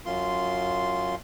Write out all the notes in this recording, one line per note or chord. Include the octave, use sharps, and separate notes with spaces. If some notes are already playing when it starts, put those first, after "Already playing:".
F#2 F4 C6